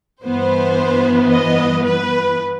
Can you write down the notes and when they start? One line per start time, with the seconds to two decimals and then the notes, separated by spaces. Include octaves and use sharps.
0.24 G2 E3 B3 C5
1.30 D#5
1.84 B4